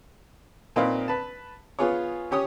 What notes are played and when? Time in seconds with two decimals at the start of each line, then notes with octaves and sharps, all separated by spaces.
0.76 A#2 C4 D#4 B4 F5
1.08 B4 A5
1.79 B3 F4 G#4 C#5
2.31 C#4 G4 C#5 D#6